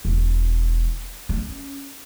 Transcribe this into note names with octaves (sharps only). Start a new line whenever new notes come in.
E1
C#4